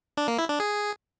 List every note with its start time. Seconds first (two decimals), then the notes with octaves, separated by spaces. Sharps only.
0.17 D4
0.28 A#3
0.39 E4
0.49 D4
0.60 G#4